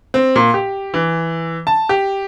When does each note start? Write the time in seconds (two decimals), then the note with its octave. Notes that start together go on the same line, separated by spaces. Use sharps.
0.14 C4
0.36 A#2
0.54 G4
0.94 E3
1.67 A5
1.89 G4